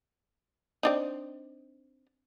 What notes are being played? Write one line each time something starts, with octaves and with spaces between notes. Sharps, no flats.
C4 D4 D#4